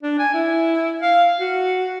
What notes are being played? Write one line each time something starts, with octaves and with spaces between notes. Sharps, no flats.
D4
G#5
E4
F5
F#4